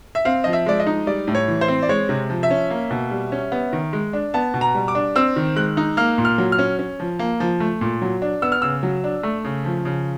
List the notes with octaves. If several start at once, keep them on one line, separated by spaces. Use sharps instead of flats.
E5
C4 F5
F3 D#5
E5
G#3 D5
D#5
D#4
G3 D5
A2
C#5
E3
C5
C4
D5
G#3 C#5
C3
F3
E5
C#4
A#3
B2
G3
C#4
B3
D#3
G#3
D4
B3 A5
B2
A#5
G3
D6
D4
C4 E6
D#3
G#3 F#6
D#4
A#3 F6
A#2
F6
F#3
F6
C#4
C#4
F3
A#3
F3
A3
A#2
F#3
D4
B3 E6
F6
C#3 E6
F#3
D4
A3
C#3
F3
C#3